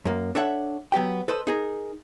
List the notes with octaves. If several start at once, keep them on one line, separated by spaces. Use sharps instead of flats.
F#2 A#3
D4 A4 C#5 E5 F#5
F#3 B3 G4 G5
A4 B4 C5 D#5
D#4 G#4 A#4